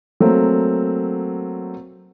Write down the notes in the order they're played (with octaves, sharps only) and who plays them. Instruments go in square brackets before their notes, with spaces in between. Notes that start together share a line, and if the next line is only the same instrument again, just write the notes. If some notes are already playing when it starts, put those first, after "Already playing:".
[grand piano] F#3 A3 A#3 C4